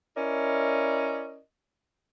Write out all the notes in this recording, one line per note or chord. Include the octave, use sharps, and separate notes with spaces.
C#4 E4 A#4 D5 D#5